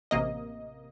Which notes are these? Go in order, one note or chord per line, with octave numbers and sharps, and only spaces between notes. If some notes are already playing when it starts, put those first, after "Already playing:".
A1 C3 A#3 D#5